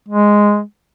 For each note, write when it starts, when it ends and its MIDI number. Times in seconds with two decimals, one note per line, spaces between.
0.08 0.61 56